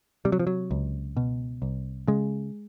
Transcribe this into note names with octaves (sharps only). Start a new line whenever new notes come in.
C3 G3
F#3
F3
F#3
C#2
B2
C2
C#3 G#3